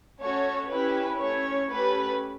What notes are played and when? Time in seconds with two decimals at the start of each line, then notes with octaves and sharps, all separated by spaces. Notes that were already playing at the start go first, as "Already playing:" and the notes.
0.20 A3 C#4 F#4 A4 C#5
0.70 C#4 E4 G4 B4
1.20 A3 C#4 E4 C#5
1.70 A3 C#4 G4 B4